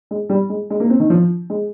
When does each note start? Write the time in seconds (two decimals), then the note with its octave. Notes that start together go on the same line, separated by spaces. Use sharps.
0.11 G#3
0.30 G3
0.50 G#3
0.70 G#3
0.80 A#3
0.90 C4
1.00 D#3
1.10 F3
1.50 G#3